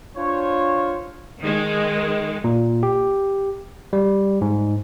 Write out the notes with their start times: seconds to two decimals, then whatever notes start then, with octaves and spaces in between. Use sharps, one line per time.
0.17 D4 F4 C5 C#5
1.41 D#3 G#3
2.44 A#2
2.83 G4
3.93 G3
4.41 G#2